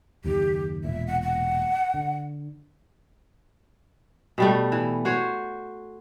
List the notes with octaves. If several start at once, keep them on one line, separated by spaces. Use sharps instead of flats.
F#1 D#2 D#3 G4
E1 A#2 E5
F#5
F#5
D3
B2 G3 A3
E3
F#4 C5 C#5